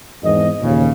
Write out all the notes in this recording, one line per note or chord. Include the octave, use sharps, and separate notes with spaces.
G#1 E2 D#5
D#2 A#2 C#3